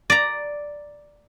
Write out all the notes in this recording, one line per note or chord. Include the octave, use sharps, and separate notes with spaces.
D5 A#5